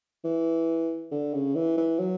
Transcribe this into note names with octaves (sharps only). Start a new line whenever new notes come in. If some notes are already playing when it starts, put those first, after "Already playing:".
E3
D3
C#3
E3
E3
F#3